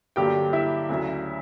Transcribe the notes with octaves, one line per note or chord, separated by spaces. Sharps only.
G2 D3 F#3 A#3 G4 G5
E4 E5
D2 C#3 F#3